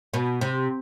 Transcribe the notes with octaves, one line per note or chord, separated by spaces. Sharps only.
B2
C3